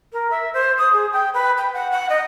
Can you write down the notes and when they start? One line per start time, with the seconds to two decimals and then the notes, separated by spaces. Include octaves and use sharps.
0.12 A#4
0.30 E5
0.53 C5
0.78 D#6
0.93 G#4
1.12 G5
1.34 B4
1.57 G5
1.73 F#5
1.91 F#5
2.09 D#5